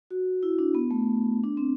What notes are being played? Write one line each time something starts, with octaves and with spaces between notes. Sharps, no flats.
F#4
E4
D4
B3
A3
D4
C4